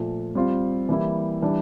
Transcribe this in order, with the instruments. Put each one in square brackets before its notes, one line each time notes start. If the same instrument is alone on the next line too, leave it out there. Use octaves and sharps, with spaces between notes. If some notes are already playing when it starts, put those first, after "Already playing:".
Already playing: [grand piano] A#2 F3 A3
G3 C4 F4
E3 G3 A#3 E4
E3 G3 D4